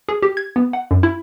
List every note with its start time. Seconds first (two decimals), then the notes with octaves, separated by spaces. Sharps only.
0.09 G#4
0.22 G4
0.37 G#6
0.56 B3
0.73 F#5
0.91 F#2
1.03 E4